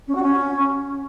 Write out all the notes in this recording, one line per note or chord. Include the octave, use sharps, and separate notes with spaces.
C#4
F#4
C#4